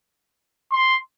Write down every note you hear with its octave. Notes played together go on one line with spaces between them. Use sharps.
C6